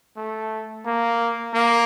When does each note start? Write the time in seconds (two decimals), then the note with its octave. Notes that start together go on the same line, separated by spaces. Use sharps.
0.17 A3
0.86 A#3
1.54 A#3